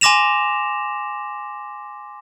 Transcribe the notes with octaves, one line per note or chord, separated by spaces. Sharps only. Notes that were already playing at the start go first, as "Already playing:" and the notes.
G#5 C6 D6 A#6 E7 F7